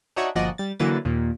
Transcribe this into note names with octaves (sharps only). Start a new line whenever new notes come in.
D4 D#4 F#4 C#5 E5 F#5
G1 A#2 F3 F#4 D5 D#5
G3 A6
D3 E3 F#3 A#3 B4 A6
D#2 A#2 A#3